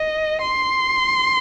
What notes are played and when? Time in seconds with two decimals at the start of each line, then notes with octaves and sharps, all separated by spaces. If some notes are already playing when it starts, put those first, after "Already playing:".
Already playing: D#5
0.42 C6